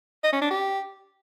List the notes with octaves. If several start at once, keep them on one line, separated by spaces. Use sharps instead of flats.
D#5
C#4
D4
G4